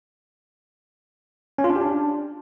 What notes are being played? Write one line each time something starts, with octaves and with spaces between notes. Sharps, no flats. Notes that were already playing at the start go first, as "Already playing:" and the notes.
C#4
F4
D4
G4
D4